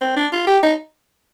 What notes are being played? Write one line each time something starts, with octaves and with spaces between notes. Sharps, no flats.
C4
D4
F4
G4
D#4